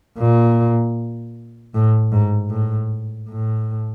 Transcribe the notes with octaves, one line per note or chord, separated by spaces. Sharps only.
A#2
A2
G#2
A2
A2